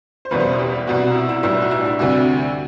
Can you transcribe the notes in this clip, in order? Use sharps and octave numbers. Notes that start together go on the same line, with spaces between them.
C5
F#1 E2 B2 G3 B4
C5
B4
G4
C2 B2 G3 F#4
E4
E4
B1 A2 G3 E4
F#4
E4
D4
E4
D2 C3 G3 F#4